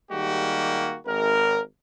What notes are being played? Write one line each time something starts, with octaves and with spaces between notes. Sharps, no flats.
D#3 G3 G#3 A#3 F#4 G4
G#1 A#4